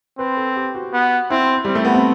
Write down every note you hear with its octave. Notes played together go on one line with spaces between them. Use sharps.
C4 B4
A4
G4
F#4
B3
C4 E4
G3 C4
A3
B3
C4